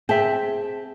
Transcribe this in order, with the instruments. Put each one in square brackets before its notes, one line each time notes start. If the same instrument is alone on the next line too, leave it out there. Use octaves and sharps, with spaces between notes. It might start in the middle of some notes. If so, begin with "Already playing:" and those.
[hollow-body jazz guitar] C4 E5 [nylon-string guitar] G#4 G5 A5